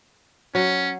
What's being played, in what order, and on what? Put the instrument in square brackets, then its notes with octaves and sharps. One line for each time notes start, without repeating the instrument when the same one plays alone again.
[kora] F#3 [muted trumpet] C#4